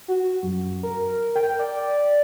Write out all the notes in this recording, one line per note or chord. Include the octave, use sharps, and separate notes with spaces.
F#4
F#2
A#4
G5
D5